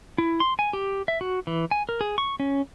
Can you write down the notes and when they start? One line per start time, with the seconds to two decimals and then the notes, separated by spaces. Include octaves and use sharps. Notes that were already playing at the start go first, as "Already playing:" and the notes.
0.18 E4
0.40 C6
0.59 G#5
0.73 G4
1.08 E5
1.21 F#4
1.47 E3
1.71 G#5
1.89 A#4
2.01 G#4
2.18 C#6
2.40 C#4